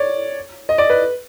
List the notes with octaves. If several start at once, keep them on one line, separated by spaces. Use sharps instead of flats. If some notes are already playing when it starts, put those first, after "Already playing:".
Already playing: C#5 D5
D#5
D5
B4